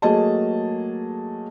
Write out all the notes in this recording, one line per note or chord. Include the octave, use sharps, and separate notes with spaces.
F#3 A3 A#3 G#4 D#5 A5